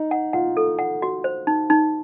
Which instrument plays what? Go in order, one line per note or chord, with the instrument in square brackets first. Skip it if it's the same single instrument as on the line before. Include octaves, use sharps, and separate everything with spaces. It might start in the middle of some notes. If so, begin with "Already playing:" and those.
Already playing: [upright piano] D#4
[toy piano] F#5
[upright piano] F4 [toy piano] F#5
[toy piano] A4
F#5
F#4
C5
D#4
D#4